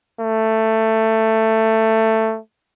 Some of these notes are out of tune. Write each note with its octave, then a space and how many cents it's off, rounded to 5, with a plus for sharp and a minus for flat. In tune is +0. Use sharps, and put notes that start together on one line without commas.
A3 +15